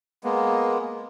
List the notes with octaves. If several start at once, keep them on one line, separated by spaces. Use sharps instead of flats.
G#3 A#3 B3